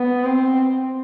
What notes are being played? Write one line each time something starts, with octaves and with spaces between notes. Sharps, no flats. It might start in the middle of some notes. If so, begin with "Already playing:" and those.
Already playing: B3
C4